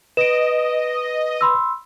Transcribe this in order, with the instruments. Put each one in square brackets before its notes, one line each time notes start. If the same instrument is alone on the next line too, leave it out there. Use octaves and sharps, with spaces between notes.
[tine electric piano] B4 [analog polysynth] D#5 [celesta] D7 E7
[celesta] B5 C6 E6